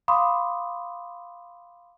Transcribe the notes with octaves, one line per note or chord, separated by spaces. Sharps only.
F5 B5 C6 D6 D#6